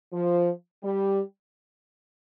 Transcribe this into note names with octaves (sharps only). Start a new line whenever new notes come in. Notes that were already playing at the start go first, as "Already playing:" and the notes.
F3
G3